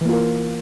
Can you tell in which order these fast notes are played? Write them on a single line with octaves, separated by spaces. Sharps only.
E3 A#3 F4 A#4